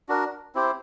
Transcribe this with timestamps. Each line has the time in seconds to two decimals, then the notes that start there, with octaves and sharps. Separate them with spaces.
0.09 D4 F#4 A#4
0.55 C4 E4 G4 C5